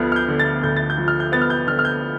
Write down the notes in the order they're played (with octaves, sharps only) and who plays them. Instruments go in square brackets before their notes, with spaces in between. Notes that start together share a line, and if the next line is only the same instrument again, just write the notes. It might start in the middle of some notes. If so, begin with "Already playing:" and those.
Already playing: [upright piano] D2 F3 B3 F6
F6
G6
D3
A6
D2 G6
A6
G6
F3
F6
G6
B3 A6
F6
G6
D3 F6
F6
G6